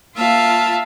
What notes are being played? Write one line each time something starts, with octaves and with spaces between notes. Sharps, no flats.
A#3 F4 E5 F5 A5